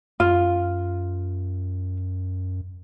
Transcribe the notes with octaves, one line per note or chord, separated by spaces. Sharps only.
F#2 F4